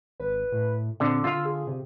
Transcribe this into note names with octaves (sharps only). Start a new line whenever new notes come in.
G#1 B4
A2
A#2 D3 C4
D3 F4 F5 E6
G#4
C3